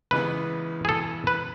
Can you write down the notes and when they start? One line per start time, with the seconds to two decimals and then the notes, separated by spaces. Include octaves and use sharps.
0.11 C#2 C#3 E3 B3 B4
0.85 G#4
0.89 A4
1.27 B4